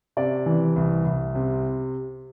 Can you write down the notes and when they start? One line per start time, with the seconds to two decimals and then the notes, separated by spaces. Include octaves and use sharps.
0.17 C3 D5
0.46 E3
0.76 C2
1.05 C2
1.35 C3